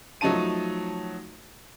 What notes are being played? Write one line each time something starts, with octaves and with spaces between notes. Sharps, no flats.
F3 F#3 A3 D#4 A5 D#7